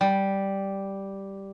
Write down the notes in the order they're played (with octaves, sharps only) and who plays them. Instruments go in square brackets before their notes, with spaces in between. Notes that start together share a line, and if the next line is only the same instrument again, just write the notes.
[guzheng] G3